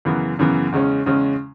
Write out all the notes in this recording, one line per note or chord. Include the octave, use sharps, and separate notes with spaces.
F#2 C#3 E3 B3
F#2 C#3 E3 B3
E2 C#3 G#3 C#4
E2 C#3 G#3 C#4